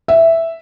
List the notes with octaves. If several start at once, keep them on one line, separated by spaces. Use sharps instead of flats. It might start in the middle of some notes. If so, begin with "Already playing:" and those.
E5